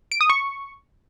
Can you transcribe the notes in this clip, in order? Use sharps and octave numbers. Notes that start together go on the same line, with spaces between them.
D7
D#6
C#6